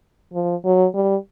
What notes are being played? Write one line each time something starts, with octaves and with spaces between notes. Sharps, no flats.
F3
F#3
G3